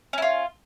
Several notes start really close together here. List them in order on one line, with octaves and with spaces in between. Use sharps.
C#4 E4 F4